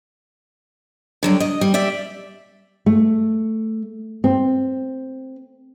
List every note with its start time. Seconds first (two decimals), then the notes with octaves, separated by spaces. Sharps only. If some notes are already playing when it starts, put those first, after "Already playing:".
1.23 D3 F#3 G3
1.40 D#5
1.61 G3
1.74 G4 D5 E5
2.86 A3
4.24 C4